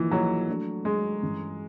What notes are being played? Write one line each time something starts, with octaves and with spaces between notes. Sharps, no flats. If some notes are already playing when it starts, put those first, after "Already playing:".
Already playing: E3 F3 A#3 D#4
F3 F#3 A#3 D#4 G#4
F#3 A3 D4
F#3 G#3 A3 D4
G2 E3 G#3 C#4 E4